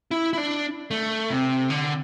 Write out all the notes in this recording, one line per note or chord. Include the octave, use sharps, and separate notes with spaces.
E4
E4
D4
A3
C3
D3